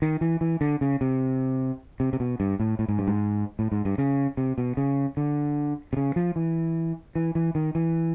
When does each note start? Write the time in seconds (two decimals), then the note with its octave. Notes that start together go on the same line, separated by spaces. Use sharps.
0.02 D#3
0.21 E3
0.41 E3
0.61 D3
0.81 C#3
1.01 C3
2.00 C3
2.13 C3
2.20 B2
2.40 G2
2.60 A2
2.79 A2
2.88 G#2
2.99 G2
3.08 G#2
3.59 A2
3.72 G#2
3.85 G2
3.98 C#3
4.37 C3
4.58 B2
4.77 C#3
5.17 D3
5.93 C3
5.97 C#3
6.16 F3
6.36 E3
7.15 E3
7.35 E3
7.55 D#3
7.75 E3